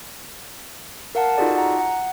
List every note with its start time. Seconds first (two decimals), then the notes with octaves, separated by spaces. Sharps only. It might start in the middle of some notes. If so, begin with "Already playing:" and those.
1.15 A#4 F5 F#5 A5
1.38 D#4 F4 F#4 G#4 A4 D5
1.56 F#5 A#5
1.79 F#5